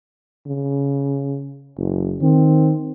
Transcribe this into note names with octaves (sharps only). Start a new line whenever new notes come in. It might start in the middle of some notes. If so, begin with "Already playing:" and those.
C#3
F#1
D#3 C4